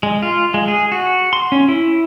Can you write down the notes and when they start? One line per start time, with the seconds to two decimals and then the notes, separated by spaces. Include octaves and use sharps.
0.03 G#3
0.22 F4
0.54 G#3
0.68 G#4
0.92 F#4
1.33 C6
1.52 C#4
1.69 E4